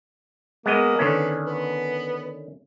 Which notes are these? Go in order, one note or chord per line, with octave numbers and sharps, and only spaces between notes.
G#3 A#3 B3 D#5
D3 D#3 B3 C#4
B3